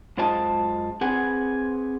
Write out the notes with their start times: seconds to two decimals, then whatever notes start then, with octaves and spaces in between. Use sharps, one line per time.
0.17 F#2 G#3 F4 C5 D#5 A5
1.01 C4 G#4 B4 F#5 G#5